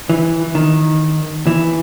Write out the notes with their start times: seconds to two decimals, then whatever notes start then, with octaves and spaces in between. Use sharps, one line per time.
0.09 E3
0.55 D#3
1.47 E3